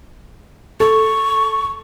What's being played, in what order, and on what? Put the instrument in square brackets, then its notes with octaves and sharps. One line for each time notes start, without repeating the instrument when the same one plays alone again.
[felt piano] A4 [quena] C#6